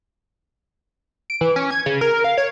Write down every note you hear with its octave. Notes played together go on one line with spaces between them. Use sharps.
D7
E3
C#4
G#6
C#3
A#4
F5
C#5